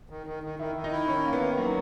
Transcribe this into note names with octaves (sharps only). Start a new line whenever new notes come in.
D#3
D#3
D#3
D#3 E4
D#3
D#4
E4
D#3 C#4
A#3
B3
D#3
F#3 A#3